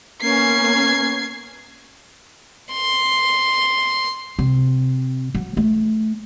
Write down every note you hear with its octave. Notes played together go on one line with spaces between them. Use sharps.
A#3 B3 C#4 G#6 C7
C6
C3
F#3
A3